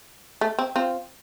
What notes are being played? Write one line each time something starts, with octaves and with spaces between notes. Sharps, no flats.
A3
C4
C4 F4